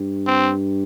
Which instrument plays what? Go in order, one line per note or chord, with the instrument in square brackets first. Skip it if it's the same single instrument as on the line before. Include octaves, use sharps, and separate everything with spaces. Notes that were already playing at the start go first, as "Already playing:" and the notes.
Already playing: [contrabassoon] G2
[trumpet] C4